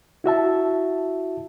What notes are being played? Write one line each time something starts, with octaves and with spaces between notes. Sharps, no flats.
E4 F#4 E5 A5